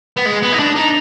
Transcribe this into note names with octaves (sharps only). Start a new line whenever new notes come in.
B3
G#3
B3
D#4
D4
D#4